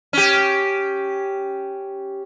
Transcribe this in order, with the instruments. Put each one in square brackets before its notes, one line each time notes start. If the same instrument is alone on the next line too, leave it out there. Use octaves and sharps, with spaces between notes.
[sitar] C#4 G4